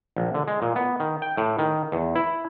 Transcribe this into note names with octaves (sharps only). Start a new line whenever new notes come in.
A#1
D3
G#3
A#2
B3
D#3
G5
A2
D#3
E2
E4